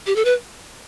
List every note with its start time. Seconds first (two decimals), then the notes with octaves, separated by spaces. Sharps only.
0.06 G4
0.16 A4
0.25 B4